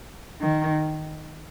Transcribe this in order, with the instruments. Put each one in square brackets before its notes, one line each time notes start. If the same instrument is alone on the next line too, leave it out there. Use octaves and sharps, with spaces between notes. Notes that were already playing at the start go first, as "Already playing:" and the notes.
[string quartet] D#3